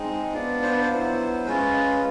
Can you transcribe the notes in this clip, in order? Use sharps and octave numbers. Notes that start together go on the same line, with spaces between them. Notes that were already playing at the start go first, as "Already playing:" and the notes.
Already playing: G#3 C4 D#4
B3 D4 F4
C5
B4
C5
F#3 B3 E4
G#3 C#4 F4 B4